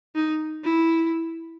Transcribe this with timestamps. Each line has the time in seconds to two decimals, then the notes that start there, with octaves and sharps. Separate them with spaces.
0.16 D#4
0.64 E4